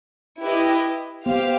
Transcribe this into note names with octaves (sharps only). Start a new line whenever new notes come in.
E4 G4 B4 D#5
B3 G4 C5 F5